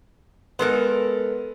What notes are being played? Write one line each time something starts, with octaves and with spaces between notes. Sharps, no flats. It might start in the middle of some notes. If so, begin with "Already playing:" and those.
G#3 B3 A4 A#4